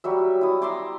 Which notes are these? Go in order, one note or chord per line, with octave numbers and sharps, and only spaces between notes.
F#3 G3 E5
E4 D#6
E5 A#5 C6 D6